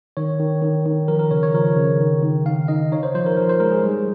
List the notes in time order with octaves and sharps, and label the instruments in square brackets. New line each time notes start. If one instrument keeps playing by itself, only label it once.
[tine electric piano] D#3 C#5
D#3
D#3
D#3
F3 A#4
A#4
C#3 C#5
C#5
F3 A#4
C#3
D#3
D#3
D#3 F5
D#4 D#5
D#4 C#5
C5
F3 C5
A#4
F3 A#4
C5
G#3 A#4
G#4
G3